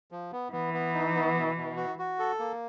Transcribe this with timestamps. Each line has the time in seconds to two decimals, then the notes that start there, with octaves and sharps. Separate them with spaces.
0.11 F3
0.32 B3
0.52 E3 B3
0.74 B3
0.94 D#4
1.14 B3
1.36 B2
1.56 B2
1.77 F#4
1.99 F#4
2.19 A4
2.39 A#3